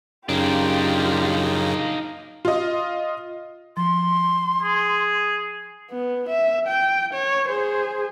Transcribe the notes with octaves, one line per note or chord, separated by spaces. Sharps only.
F#2 C#3 A#3 D4 D#4 F4 G4
F4 D#5
F3 C6
G#4
B3
E5
G5
C#5
G#4 C5